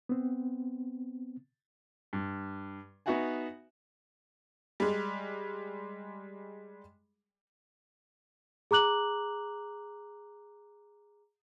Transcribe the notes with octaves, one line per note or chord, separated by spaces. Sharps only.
B3 C4
G2
B3 D#4 F#4 E5 F#5 G#5
G3 G#3
G#4 A#5 D6 F#6 F#7